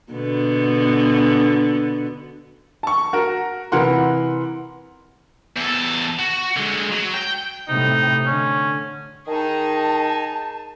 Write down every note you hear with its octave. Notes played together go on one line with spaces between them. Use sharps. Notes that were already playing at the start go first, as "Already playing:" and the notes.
B2 D3 B3
A5 C#6
F#4 A#4
C3 E3 A#4 F#5 C6
E2 A4
F#4
D3 G#3
F#3
G5
A2 C3 D#4
D3 C#4
D#3 D#4 G#4 A5